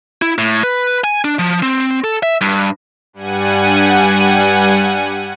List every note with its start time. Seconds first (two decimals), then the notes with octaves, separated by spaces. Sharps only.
0.22 E4
0.38 A2
0.63 B4
1.04 G#5
1.25 D4
1.39 F3
1.63 C4
2.04 A4
2.23 E5
2.41 G2
3.13 G2 G3 F#5 G#5 D#7